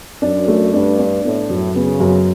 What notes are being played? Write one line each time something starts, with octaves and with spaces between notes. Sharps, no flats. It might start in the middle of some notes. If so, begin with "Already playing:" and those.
F#2 D4
A3
G2 D4
D4
A2 B3
F#2
C#3 B3
F#2